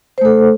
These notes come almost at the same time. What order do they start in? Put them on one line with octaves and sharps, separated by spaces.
C5 A3 A4